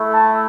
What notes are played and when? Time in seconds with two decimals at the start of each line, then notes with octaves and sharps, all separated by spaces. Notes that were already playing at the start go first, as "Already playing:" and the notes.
Already playing: A3 E4
0.12 A5